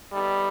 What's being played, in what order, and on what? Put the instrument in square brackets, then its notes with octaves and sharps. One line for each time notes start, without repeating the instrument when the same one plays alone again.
[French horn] G3 [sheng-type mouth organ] B3 D#4 A4 E5 A5